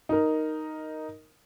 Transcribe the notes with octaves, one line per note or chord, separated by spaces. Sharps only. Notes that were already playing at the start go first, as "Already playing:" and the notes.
D#4 A#4